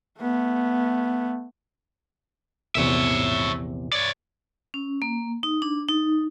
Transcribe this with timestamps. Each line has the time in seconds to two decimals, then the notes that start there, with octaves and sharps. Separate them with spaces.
0.20 A3 B3
2.75 A#1 E2 C3 C#5 E5
3.92 C#5 D5
4.74 C#4
5.02 A#3
5.43 D#4
5.62 D4
5.88 D#4